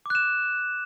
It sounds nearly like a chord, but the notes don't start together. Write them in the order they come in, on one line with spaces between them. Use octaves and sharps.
D6 F#6 E7